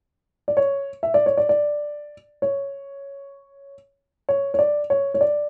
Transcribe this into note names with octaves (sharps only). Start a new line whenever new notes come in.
D5
C#5
E5
D5
C#5
D5
D5
C#5
C#5
C#5
D5
C#5
C#5
D5